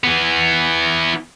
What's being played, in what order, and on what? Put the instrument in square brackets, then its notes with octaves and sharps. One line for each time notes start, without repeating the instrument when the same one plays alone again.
[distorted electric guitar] E3 B3